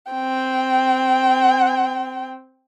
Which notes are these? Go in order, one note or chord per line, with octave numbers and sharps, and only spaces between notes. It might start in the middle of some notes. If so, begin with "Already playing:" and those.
C4 G5